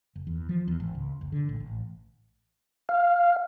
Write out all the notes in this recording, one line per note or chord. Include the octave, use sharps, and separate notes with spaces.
F#1
E2
F3
E2
G#1
C#2
F#1
D3
A1
A1
F5